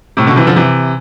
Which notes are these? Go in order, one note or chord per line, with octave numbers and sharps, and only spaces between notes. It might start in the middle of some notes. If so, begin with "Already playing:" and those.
A2 C3
B2 D3
C3 E3
D3 F3
C3 E3